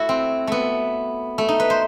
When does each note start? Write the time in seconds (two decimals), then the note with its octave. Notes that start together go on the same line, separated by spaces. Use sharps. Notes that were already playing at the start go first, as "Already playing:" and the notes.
Already playing: A3 E4 F#4
0.09 C4
0.47 A3 B3
1.38 A3
1.48 D#4
1.60 B4
1.70 C5